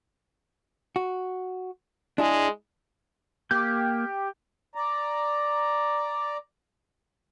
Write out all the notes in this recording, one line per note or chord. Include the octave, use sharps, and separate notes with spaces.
F#4
G#3 D4 E4 G#4
A#3 G4 G6
D5 A#5